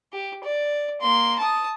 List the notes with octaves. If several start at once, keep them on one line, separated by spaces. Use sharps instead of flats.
G4
D5
A#3 C6
A5 D#6